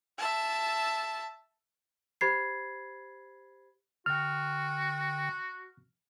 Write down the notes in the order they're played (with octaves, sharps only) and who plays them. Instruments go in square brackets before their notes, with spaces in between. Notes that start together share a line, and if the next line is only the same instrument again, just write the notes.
[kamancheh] E5 A5
[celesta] G4 C5 B5 G#6 A6 C7
[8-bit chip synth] D3 G5 [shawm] F#4 [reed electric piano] F6